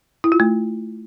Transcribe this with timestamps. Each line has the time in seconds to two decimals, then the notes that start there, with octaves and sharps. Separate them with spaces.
0.24 E4
0.32 F4
0.40 A3